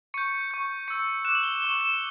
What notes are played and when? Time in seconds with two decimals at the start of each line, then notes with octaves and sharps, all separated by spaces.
0.14 C#6 G6 C#7
0.51 C#6 G6
0.88 C#6 E6 G6 C#7
1.25 F#6 E7
1.28 D6
1.35 F#7
1.43 G7
1.62 C#6 F#6 G7
1.71 F#7
1.81 E7